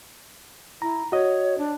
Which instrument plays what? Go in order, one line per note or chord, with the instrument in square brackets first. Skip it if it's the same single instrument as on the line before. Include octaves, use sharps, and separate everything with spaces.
[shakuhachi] E4 [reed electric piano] A#5
[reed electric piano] F#4 D#5 [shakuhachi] C#5
[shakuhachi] D4